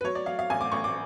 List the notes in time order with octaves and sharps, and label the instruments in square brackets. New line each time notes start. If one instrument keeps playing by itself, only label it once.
[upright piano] B4
F#3 C#5
D5
F#3 F5
F5
A1 G#5
D6
A1 C#6
D6